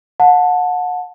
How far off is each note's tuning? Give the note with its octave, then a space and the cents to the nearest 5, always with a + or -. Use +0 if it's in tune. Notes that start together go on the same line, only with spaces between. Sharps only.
F#5 -30 A5 +0